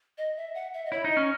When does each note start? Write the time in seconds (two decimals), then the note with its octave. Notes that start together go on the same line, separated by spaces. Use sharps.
0.18 D#5
0.37 E5
0.55 F#5
0.74 E5
0.86 D#5
0.92 E4 C#5
1.04 D#4
1.10 D#5
1.17 C#4